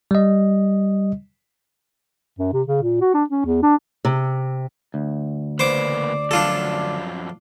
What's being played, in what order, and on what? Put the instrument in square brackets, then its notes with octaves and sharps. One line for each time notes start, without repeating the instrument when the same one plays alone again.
[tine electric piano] G3 D#5
[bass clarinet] F#2
C3
C#3
A#2
F#4
D4
C#4
E2
D4
[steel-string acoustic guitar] C3
[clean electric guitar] D2
[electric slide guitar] C#3 A#3 B4 [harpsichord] C5 D6 [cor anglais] D5
[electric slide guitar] F#2 F3 F#3 [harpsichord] D4 F4 A4